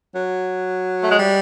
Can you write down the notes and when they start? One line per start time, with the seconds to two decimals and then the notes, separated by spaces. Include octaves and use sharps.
0.15 F#3
1.03 A3
1.10 G#3
1.18 G3